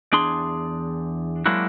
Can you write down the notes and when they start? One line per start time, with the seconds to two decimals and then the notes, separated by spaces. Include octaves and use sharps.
0.13 E2 D4 G#4 C6
1.46 F#3 G#3 A#3 D4 E4 F#4